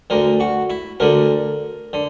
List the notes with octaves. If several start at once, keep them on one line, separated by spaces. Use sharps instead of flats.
D2 D3 A#4
F#4
E4
D2 D3 A#4
D3